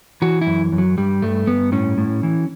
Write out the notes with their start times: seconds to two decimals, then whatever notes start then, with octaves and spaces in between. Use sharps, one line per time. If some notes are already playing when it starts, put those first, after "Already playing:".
0.22 E3 F#4
0.42 E4
0.47 F#2
0.72 F#2
0.78 F#3
0.98 G2 G3
1.22 G2 A3
1.47 G2 B3
1.72 A2 C#4
1.98 A2
2.23 E3